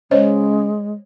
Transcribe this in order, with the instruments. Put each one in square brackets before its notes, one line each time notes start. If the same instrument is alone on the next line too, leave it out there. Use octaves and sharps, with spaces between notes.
[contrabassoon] C#3 [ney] G#3 [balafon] C5 C#5 D#5